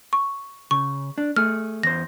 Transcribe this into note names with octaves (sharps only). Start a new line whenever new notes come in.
C#6
C#3 C#6
D4
A3 G#4 F6
E2 C5 A#6